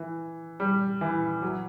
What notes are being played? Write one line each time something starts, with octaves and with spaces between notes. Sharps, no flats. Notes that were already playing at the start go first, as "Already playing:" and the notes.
Already playing: E3
G3
E3
F#3